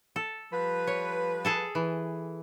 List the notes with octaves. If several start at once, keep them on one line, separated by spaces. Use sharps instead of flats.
A4
F3 G3 B4
C#5
G#4 A4 A5
E3